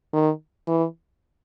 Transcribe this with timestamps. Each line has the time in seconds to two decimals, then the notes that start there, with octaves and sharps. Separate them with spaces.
0.13 D#3
0.68 E3